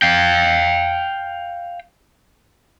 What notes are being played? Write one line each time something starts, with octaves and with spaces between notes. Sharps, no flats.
F5 G5